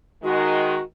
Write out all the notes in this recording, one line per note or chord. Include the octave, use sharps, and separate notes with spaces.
D#3 G#3 F#4